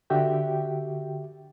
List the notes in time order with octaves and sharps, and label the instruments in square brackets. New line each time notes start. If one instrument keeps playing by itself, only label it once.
[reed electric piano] D3 F#4 G4 E5 G5